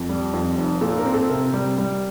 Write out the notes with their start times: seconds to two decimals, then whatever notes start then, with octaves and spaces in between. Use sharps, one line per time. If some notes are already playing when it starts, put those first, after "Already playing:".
Already playing: F2
0.09 G3
0.34 F2
0.58 F1
0.81 A#2 A4
0.98 A#4
1.05 C4
1.14 A4
1.29 C3 A#4
1.54 G3
1.78 G3